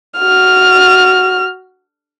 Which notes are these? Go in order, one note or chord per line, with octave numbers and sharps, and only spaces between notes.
F#4 F6